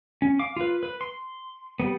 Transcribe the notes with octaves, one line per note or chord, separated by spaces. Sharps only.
C#4
F5 D6
F4 B4
B4
C6
G3 A#3 B3